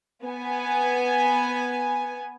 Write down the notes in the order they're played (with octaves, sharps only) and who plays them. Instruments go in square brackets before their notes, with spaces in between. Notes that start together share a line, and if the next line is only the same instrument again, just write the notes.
[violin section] B3 G#5